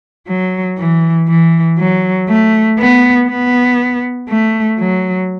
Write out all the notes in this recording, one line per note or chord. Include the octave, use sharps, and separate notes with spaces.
F#3
E3
E3
F#3
A3
B3
B3
A3
F#3